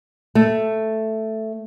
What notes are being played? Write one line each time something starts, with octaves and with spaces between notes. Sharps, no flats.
A3